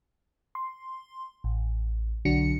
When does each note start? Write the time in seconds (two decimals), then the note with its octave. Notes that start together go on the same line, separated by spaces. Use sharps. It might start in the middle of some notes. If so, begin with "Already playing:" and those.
0.55 C6
1.44 A1
2.25 B1 D3 F#3 D4 F#4 C#7